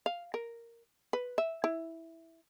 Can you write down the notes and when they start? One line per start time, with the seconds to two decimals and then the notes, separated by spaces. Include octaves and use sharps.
0.06 F5
0.34 A#4
1.13 B4
1.38 E5
1.64 E4